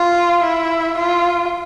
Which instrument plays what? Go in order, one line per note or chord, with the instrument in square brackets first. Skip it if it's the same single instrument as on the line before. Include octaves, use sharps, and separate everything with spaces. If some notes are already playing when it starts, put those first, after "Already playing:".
Already playing: [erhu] F4
E4
F4